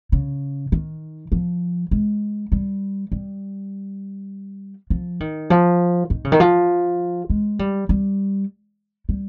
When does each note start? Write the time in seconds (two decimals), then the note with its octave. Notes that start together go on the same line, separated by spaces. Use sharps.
0.12 C#3
0.72 D#3
1.32 F3
1.91 G#3
2.52 G3
3.12 G3
4.90 F3
5.20 D#3
5.50 F3
6.10 D#3
6.25 C#3
6.32 D#3
6.40 F3
7.30 G#3
7.59 G3
7.89 G3
9.09 G3